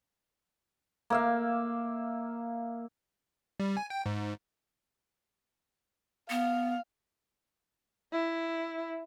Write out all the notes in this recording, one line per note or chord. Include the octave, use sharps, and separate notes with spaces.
A#3 E5 F5
G3
G#5
G5
G#2
B3 F5
E4